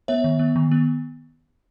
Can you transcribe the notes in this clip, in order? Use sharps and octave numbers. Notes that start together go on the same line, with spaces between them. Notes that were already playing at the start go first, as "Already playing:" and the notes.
B3 C#5 E5
D#3
B3
D#3
B3